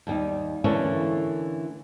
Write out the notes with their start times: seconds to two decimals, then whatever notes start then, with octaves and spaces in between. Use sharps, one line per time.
0.07 D#2 G3 D#4
0.64 D3 E3 A3 A#3 C#4 E4